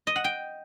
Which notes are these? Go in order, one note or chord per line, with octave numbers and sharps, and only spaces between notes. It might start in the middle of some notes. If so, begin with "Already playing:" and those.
D#5
F#5
G5